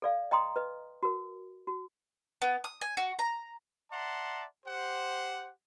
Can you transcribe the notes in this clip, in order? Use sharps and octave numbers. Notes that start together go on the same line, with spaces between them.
A4 D5 F5
D#5 G5 A#5 C6 D#6
B4 D#5
F#4 A#4
F#4
B3
D#6
G#5
F#4
A#5
D5 E5 F#5 A5 A#5 C6
G4 C5 F#5